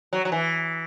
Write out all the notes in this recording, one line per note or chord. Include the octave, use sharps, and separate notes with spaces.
F#3
F#3
E3